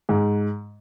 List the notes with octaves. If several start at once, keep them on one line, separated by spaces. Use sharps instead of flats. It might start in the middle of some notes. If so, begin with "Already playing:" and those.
G#2